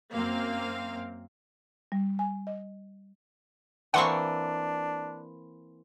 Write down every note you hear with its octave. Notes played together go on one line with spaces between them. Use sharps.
F#2 A#3 C4 F5
G3
G#5
D#5
E3 A#3 C4 D4 F#5 C6 C#6